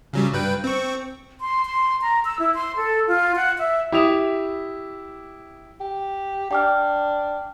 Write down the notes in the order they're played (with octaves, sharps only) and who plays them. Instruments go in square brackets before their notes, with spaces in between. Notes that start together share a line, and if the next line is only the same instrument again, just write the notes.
[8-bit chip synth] C#3 F#3 G3
G2 B4 G5
C4 C#6
[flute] C6
C6
A#5
E6
E4
C6
A4
F4
F#5
E5
[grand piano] E4 G4 E5 D#6 F7
[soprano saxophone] G4
[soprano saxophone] D4 [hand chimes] G5 D6 F6